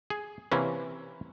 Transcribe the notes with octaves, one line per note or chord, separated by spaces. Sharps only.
G#4
C3 E3 A#3 C#4